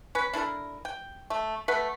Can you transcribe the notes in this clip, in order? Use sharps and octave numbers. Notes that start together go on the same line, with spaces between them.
C#4 B4
D4 E4 A4 A#4
G5
A3
A3 B4 F#5